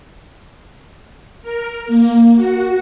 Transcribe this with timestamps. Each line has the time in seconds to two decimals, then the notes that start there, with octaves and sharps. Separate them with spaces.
1.42 A#4
1.87 A#3
2.35 F#4